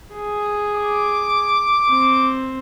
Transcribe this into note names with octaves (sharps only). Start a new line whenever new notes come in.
G#4
D6
C4